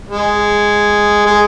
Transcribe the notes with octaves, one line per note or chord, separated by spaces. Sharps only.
G#3
G#3